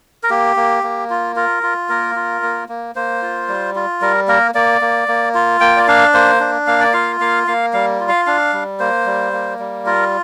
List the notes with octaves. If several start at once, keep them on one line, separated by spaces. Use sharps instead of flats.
A#4
A#3 G4
A#3
A#3
F4
F4 A#4
F4
A#3 A#4
F4
A#3
A#3
A#3 C5
F4
G3
F4
G3 A#4
A#3 A#4
A#3 D5
A#3
A#3
F4
A#3 G5
D5
D4 F5
A#3 C5
D4
A#3 F5
D5
F4 F5
A#3 F5
A#3 F5
G3 F5
F4
F5
D4 F5
G3
A#3 C5
G3
A#3
G3
F4 A#4